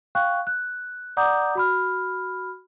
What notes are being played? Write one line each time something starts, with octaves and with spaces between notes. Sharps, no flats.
F5 G5 C#6 F#6
F#6
D5 F#5 A#5 D6 D#6 G6
F#4 B5 F6